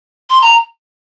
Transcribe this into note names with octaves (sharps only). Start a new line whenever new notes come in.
C6
A#5